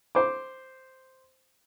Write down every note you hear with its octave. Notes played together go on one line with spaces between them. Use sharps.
C5 D6